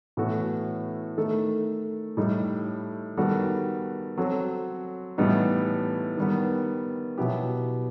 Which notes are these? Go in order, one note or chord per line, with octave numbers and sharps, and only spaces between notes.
A2 E3 B3 F#4 A4
D#3 A3 D#4 A4
A2 G3 D#4 A4
D#3 G3 B3 F#4 A4
F#3 C4 F#4 A4
A2 E3 G3 B3 D#4
D#3 G3 B3
B2 F#3 B3 E4 G4